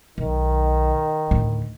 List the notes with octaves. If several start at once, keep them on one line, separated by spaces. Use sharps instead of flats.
B1 D#3
D2 A2